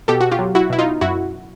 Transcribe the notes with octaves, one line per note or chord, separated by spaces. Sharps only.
B2 G4 A4
F#4
F4 G4
F#3
E4 F#4
B2 E4
D#4 F4
F#2 E4 F#4